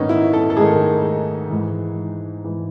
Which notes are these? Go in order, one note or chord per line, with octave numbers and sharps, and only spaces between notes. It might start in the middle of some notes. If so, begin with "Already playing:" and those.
Already playing: G#2 D#3 B3 C#4 D#4
E4
A4
A4
G#2 D#3 G#4
G#2 E3
G#2 E3